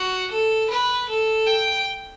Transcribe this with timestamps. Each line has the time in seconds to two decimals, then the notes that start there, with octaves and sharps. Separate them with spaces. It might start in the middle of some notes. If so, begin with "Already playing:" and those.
Already playing: F#4
0.31 A4
0.71 B4
1.10 A4
1.47 G5